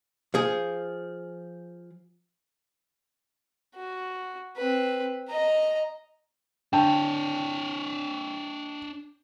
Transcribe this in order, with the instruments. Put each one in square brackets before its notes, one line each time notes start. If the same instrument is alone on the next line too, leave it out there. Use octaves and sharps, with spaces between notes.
[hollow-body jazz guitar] F3 G#4
[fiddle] F#4
C4 B4
D#5 A#5
[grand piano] D3 [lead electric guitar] D4 C#5 [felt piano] G5 A5